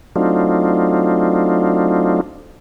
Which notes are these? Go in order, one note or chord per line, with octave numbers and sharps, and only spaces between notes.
F#3 A3 C4 D4 D#4 F4